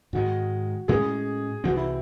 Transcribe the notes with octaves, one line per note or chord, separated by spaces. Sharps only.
G#2 D#3 G#3 F#4
A2 G#3 C#4 G#4
C2 C3 E3 C4 F#4
E4